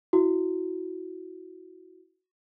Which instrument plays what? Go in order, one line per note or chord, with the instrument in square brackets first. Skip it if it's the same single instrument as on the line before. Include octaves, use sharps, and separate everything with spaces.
[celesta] E4 F#4